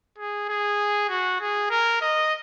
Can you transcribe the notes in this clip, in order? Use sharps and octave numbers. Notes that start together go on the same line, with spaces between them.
G#4
G#4
F#4
G#4
A#4
D#5